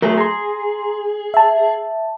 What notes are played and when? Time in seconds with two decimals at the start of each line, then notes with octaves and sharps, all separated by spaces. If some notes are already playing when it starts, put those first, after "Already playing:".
0.02 F#3 A3 G#4 A#4
0.17 G#4 A#5 C6
1.34 E5 A5